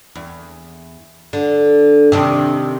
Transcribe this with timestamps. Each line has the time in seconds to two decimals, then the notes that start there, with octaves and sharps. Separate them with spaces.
0.15 E2
1.33 D3
2.12 C3 D#3 D4